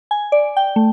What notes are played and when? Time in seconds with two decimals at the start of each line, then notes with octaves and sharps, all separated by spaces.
0.11 G#5
0.32 D5
0.57 G5
0.76 A3